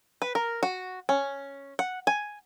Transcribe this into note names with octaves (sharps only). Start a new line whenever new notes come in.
B4
A#4
F#4
C#4
F#5
G#5